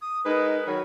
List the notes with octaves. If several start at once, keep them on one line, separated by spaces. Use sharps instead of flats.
D#6
G#3 D#4 A#4 B4
D#3 F#3 B5